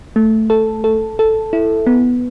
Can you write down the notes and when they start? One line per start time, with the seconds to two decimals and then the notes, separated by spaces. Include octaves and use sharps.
0.16 A3
0.50 A4
0.84 A4
1.19 A4
1.53 E4
1.87 B3